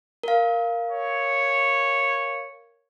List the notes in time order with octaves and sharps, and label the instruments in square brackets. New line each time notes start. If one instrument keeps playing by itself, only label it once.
[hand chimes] A#4 F5
[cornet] C#5